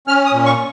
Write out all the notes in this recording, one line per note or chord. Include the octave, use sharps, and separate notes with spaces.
C#4 F6
D#6
A#2
C#6